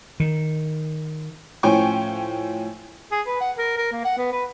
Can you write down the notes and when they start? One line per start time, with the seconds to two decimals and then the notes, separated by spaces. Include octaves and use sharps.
0.20 D#3
1.63 A2 F3 C#4 G5 G#5 C#6
3.11 G#4
3.27 B4
3.41 F#5
3.58 A#4
3.77 A#4
3.92 A#3
4.05 F#5
4.17 B3
4.32 B4